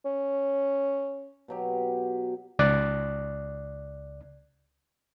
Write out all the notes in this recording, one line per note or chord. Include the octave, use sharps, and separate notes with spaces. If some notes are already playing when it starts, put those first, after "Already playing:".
C#4
B2 F#3 G4
C#2 D5 F#6